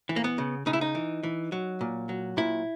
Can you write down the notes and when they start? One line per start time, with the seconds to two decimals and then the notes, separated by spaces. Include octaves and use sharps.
0.09 E3
0.16 A#3
0.24 B3
0.38 C#3
0.66 C#3 D#4
0.73 E4
0.81 D#4
0.95 E3
1.23 E3
1.52 F#3
1.81 A#2
2.09 F#3
2.37 A#2 E4